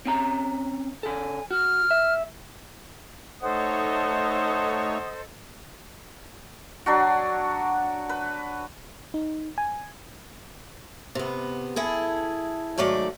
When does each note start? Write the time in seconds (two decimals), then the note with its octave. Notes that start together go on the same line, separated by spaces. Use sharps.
0.06 C4 C#4 A#5
1.03 C#3 A4 G#5
1.51 F#4 F6
1.91 E5
3.42 A3 D#4 A4 C5 C#5 D#5 F#5 D#6
6.86 F#3 D4 F#4
8.09 B4
9.14 D#4
9.58 G#5
11.15 C3 B3
11.76 E4 G#4 A4
12.78 G#2 D#3 F#3 A3 D5